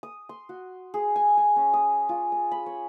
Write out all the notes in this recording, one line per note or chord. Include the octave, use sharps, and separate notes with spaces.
D#6
C6
F#4
G#4
G#5
G#5
C#4
D#6
F4
D#6
B5
C#5